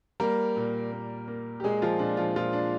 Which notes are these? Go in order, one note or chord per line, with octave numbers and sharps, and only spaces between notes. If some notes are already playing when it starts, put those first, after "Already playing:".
G3 A#3 A#4
A#2
A#3
A#3
G4
A#2 G#3 G#4
F3 F4
A#2 D4
F3 F4
A#2 F3 F4
D4